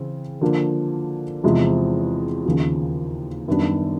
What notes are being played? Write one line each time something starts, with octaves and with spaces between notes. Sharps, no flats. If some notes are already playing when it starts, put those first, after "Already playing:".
Already playing: C#3 E3 C4
D3 F3 A#3
E2 C3 F3 G#3
D#2 C#3 F3
F#2 D#3 G3 B3 D4